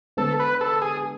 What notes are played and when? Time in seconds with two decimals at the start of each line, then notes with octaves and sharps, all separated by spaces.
0.17 D3 G#3 B3 A4
0.39 B4
0.61 A4
0.82 G#4